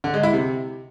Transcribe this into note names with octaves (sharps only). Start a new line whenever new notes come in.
D3
G#3
E4
C3